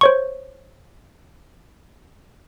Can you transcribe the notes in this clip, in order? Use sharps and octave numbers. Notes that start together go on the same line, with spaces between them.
C5 C#5 C#6